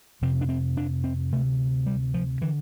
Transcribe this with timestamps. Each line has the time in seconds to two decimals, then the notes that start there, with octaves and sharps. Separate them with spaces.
0.22 F2 C3 C4
0.41 D4
0.49 C4
0.77 D4
1.04 C4
1.32 D2 C3 A3
1.87 G3
2.14 F3
2.42 D3 E3